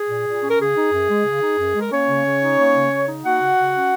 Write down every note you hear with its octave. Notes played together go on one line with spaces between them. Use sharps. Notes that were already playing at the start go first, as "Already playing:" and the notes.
Already playing: G#4
A#2
A#2
C#4
A#4
C#3 G#4
D#4
F#2
G#3
C#3
D#4
F#2
G#3 A#4
A#3 C#4 C#5
C#3
C#3
D#4
A#3
C#3
C#3
D#4
A#3 F#4 F#5
C#3
C#3
C#4